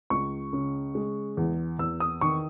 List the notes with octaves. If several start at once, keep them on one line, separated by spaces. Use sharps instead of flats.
C#2 C#6
C#3
G#3
E2
E2 E6
D#6
D#3 C#6